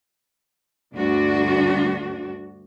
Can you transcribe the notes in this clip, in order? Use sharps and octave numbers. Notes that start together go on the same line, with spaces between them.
D2 G2 D4 F#4